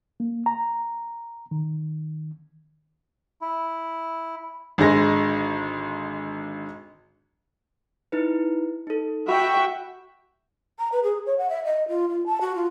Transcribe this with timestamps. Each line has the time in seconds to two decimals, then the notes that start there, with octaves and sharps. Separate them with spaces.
0.20 A#3
0.46 A#5
1.51 D#3
3.41 E4
4.78 G#1 D3 G#3 A#6
8.12 D#4 E4 B4
8.87 D#4 A4
9.29 F#4 E5 G5 B5
10.79 A#5
10.92 B4
11.04 G#4
11.26 C#5
11.38 F#5
11.50 E5
11.65 D#5
11.88 F4
12.10 F4
12.26 A5
12.41 F#4
12.55 F4